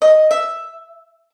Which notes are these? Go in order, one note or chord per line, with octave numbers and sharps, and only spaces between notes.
D#5
E5